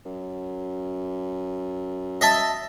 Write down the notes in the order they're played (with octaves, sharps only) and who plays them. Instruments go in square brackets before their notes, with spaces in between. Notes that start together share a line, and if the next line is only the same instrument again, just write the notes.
[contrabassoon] F#2
[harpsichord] D#5 E5 A5